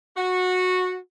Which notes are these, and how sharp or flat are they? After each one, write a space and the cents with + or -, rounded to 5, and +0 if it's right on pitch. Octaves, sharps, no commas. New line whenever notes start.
F#4 -15